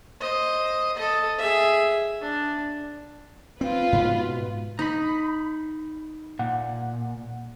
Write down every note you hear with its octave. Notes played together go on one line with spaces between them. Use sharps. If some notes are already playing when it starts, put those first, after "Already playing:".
C5 D#5
A4 D#5
G#4 E5
D4
C4 F4 B4
G#2 B2
D#4 A#5 B5
A#2 F#5